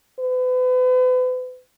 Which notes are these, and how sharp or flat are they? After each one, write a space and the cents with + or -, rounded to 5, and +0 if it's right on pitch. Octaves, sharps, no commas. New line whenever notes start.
B4 +40